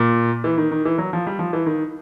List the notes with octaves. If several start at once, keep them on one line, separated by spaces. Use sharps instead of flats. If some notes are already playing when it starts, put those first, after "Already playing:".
Already playing: A#2
E3
D#3
D#3
E3
F#3
F3
G3
F3
E3
D#3